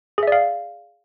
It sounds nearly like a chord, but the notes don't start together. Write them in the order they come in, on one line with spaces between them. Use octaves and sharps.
G#4 E5 D5 F5